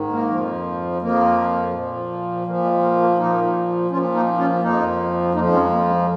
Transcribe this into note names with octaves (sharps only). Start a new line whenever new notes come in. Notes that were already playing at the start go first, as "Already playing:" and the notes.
Already playing: G#2 D#3
A#3
F2 F3
F2 F3 A#3
A#2 F3
A#2 F3 A#3
G#3
A#3
A#3
A#2 F3 A#3 D#4
A#2 F3 C#4 F4
A#3 D#4
C#4 F4
F2 F3 A#3 D#4
F2 F3 A#3 D#4
G#3 C#4
A#3
G#3